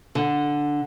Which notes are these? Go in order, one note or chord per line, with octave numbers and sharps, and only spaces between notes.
D3